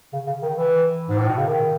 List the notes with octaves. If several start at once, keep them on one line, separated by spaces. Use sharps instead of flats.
C#3
C#3
D#3
E3
G#2
A2
B2
C#3
D#3